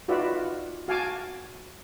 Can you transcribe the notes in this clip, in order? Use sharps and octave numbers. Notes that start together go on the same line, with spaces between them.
D#4 F4 F#4 B4 D5 E5
F#4 F5 G#5 A5 D6